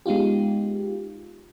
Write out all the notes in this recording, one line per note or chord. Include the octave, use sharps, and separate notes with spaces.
G#3 B3 D#4 F4 G4